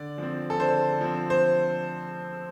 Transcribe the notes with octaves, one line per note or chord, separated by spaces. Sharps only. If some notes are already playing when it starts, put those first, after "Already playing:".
Already playing: D3 D5
F3 C4
A4
D3 C5
F3 C4
C5